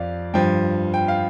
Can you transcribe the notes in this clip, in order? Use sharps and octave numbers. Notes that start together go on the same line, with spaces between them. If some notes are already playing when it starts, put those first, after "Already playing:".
Already playing: F2 F3 D5 F5
G2 F3 G5
G5
F5